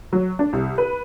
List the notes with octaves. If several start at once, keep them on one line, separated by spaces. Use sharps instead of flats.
F#3
D4
C2
B4